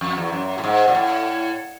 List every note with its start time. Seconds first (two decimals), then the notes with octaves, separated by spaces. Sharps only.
0.01 F2
0.17 E2
0.32 F#2
0.58 A2
0.64 G#2
0.88 A#2
0.95 A2